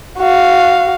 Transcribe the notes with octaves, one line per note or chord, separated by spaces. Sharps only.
F#4 F5